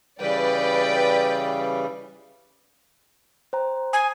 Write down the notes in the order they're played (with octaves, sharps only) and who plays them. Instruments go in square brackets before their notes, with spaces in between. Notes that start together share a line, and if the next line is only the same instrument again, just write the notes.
[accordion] C#3 E3 G3 [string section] B4 D5 G5
[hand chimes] C5 G5 A#5
[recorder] G#5 [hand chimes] D#6 C7